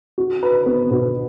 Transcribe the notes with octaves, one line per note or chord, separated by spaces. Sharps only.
F#4
B4
B3
B2